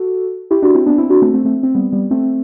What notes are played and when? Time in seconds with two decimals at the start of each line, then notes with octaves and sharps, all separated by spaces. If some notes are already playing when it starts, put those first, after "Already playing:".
Already playing: F#4 A4
0.51 E4 G4
0.62 D4 F#4
0.74 C4 E4
0.86 B3 D4
0.98 C4 E4
1.10 D4 F#4
1.22 A3 C4
1.34 A3 C4
1.45 A3 C4
1.63 C4
1.75 G3 B3
1.92 G3 B3
2.11 A3 C4